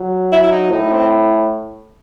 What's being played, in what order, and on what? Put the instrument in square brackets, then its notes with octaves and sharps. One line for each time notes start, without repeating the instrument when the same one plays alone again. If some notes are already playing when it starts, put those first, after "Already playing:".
Already playing: [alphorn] F#3
[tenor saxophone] E4
E4
D#4
[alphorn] A2 [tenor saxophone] D#4
[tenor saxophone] C4